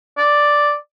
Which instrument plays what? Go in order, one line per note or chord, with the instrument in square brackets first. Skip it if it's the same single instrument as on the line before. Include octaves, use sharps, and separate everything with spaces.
[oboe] D5